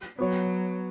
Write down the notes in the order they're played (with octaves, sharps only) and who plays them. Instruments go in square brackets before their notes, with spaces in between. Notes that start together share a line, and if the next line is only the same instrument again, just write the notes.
[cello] F#3 [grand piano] B3 F#4 C#5